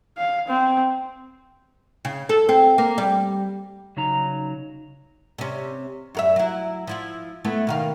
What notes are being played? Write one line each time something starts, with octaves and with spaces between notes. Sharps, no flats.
F5
C4
C#3
A4
C4
A#3
G3
C#3 F#3 D#4 A#5
C3 C#4
F#2 A#4 E5
F#3 E4
F3 E4 F4
A3 B3 E4
B2 D#3 F5